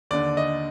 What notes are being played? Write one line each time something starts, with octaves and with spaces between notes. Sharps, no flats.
D#2 D3 D5
D#5